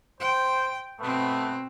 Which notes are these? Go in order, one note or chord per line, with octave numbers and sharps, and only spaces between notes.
C5 G5
B2 A3 B3 C4 B4